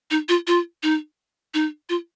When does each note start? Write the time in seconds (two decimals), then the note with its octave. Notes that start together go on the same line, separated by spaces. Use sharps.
0.11 D#4
0.29 F4
0.47 F4
0.83 D#4
1.54 D#4
1.89 F4